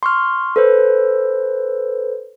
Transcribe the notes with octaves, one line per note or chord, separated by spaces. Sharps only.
C6 C#6 F6
A4 B4 C5